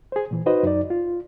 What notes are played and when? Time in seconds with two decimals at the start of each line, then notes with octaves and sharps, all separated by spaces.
0.12 G#4 C5
0.31 A#2 E3
0.46 D#4 F#4 B4 C5 D#5
0.63 F#2 D#4 D5
0.90 F4